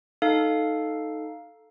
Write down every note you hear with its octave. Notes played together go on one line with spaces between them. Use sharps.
D#4 A4 F5